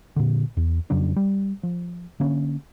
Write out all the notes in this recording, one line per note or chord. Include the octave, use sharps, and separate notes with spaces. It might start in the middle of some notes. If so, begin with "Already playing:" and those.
A#2 D3
E2
F2 C#3 F#3 D4
G3
F3
D3 A#3 C#4